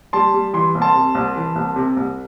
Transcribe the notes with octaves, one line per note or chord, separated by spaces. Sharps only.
G3 A5 C6
G3
E3 C6
C2
A5 C6
C3
C2
E3
C2
C3
C2